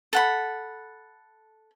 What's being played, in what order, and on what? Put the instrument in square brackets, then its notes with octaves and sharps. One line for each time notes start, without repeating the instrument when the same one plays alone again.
[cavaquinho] A4 F#5 B5